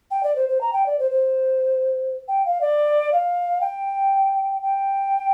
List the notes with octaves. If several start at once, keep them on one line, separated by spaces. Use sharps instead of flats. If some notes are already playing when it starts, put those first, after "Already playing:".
G5
D5
C5
C5
A#5
G5
D5
C5
C5
G5
F5
D5
F5
G5
G5